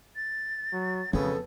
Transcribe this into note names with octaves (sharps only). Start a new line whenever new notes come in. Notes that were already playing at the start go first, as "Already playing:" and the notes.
A6
F#3
F2 C#3 F#3 B3 A4